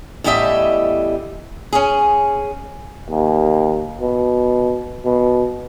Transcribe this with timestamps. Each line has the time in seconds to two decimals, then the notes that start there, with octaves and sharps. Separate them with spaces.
0.24 E2 A2 G3 G4 D#5 E5
1.73 C#4 G#4
3.10 D#2
4.01 B2
5.05 B2